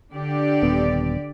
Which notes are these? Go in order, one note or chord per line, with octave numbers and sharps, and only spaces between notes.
D3 G4 D5
D#1 B3